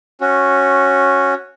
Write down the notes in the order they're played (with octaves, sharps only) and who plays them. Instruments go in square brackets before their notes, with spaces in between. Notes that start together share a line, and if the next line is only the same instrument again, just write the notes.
[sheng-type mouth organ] C#4 F#4